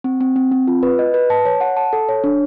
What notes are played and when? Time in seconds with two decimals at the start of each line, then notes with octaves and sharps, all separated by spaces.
0.04 C4
0.21 C4
0.36 C4
0.52 C4
0.67 F4
0.83 B4
0.99 D#5
1.14 B4
1.30 A5
1.45 C#5
1.61 F#5
1.77 A5
1.93 A4
2.09 C#5
2.24 D4